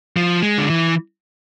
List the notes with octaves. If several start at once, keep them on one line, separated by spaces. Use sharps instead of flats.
F3
G#3
D3
E3